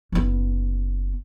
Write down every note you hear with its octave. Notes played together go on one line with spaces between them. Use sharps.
F#1 B3